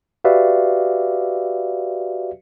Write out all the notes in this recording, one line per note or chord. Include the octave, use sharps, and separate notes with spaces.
F#4 G4 B4 D5 E5 F5